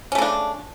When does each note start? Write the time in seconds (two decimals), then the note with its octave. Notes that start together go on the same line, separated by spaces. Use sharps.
0.12 C#4
0.15 A3
0.18 C#3
0.22 D4